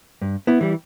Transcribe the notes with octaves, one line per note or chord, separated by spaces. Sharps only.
G2
B3 E4
E3 G3